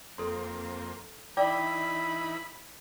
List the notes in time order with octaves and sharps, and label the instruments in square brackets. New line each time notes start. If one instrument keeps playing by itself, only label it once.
[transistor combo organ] F2 A#3 C4 [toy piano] A4 C6
[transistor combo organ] E3 D#4 E4 [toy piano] D5 G5 D6 [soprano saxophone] B5